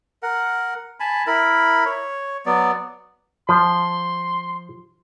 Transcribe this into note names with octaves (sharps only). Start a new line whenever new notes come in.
A#4 F#5
G#5 A5 B5
E4 A#4 B5
C#5
F#3 B3 D5
F3 C6